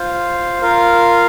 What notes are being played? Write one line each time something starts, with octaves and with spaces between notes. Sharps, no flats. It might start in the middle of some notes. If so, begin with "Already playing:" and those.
Already playing: F4 C5 F5
F4 A#4 F5